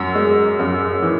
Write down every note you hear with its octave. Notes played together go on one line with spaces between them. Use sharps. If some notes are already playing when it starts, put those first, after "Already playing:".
Already playing: F#2 F#4
G#3
F#2
E3